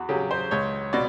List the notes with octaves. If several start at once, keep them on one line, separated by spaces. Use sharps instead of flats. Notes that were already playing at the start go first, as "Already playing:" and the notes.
Already playing: E2 F#4
C#3 F#3 G4
C5
C#2 C#5
B2 D5